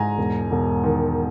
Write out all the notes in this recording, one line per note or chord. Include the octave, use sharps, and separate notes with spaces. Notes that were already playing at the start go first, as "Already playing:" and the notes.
Already playing: G#2 G#5 A#5
E1
E1
D#3